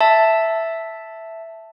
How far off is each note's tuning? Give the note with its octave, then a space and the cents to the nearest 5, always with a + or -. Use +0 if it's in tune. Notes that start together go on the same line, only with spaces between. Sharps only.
E5 +0 A5 +0